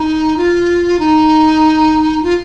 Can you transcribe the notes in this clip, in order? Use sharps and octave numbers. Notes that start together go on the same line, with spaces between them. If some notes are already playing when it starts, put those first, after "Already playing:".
Already playing: D#4
F4
D#4
F4